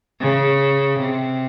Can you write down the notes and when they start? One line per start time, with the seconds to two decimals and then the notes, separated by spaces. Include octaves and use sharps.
0.20 C#3
0.99 C3